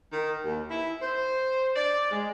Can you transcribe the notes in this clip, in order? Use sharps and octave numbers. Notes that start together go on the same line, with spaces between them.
D#3
D#2
E4
C5
D5
G#3